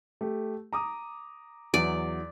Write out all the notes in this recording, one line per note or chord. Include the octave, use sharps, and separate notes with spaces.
A3 G4 A4
A#5 D6 D#6
E2 F#3 D5